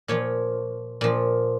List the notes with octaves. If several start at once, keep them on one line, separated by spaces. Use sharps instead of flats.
A#2 F3 C#5
A#2 F3